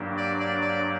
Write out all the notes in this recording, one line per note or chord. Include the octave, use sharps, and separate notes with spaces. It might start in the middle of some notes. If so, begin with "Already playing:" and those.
Already playing: G2 F#3 A#3 D4 G4
D5
D5
D5